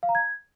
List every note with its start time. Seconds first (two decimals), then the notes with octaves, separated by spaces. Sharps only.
0.03 F5
0.09 A#5
0.15 G#6